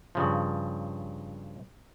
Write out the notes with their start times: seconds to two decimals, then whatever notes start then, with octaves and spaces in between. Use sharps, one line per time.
0.15 G2 C#3 F3